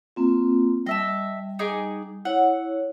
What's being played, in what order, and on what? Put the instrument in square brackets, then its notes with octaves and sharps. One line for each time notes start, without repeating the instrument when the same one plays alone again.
[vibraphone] A#3 C4 F4
[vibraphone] G3 [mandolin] D#5 E5 A5
[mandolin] D#4 G#4 D6
[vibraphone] E4 C#5 [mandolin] F#5